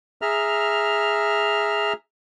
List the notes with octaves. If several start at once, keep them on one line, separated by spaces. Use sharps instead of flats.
G#4 E5 A#5 F6